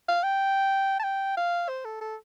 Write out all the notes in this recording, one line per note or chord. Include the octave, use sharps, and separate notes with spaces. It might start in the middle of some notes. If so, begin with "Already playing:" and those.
F5
G5
A5
G5
F5
C5
A4
A4